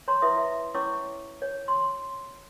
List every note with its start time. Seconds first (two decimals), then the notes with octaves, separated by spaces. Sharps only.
0.08 C#5 A#5 C6
0.22 E4 B4 E5 C6 D#6
0.38 E5
0.74 C#4 E4 C#5 C#6 D6 E6
1.42 C#5
1.68 C6